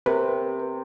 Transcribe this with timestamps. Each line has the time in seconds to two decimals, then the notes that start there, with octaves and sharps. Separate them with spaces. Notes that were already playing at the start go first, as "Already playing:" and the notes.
0.06 C3 A#4 B4